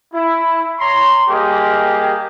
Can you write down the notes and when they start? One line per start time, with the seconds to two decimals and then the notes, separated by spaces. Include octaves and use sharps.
0.14 E4
0.78 C#5 A#5 C6
1.30 G3 A#3 G4 G#4 D#5